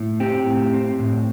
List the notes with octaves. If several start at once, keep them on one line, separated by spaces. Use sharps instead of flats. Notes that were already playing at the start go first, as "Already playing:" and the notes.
Already playing: A2
C4 G4
A2
C4
A2